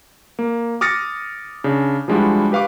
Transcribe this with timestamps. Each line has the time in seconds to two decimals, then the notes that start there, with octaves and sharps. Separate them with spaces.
0.39 A#3
0.81 D6 D#6 F6 A6 A#6 C#7
1.64 C#3 D4
2.08 F3 G3 G#3 D4 E4 F#4
2.52 G4 B4 F5 C#6 D6